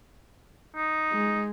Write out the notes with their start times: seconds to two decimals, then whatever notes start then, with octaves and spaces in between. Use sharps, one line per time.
0.76 D#4
1.13 G#3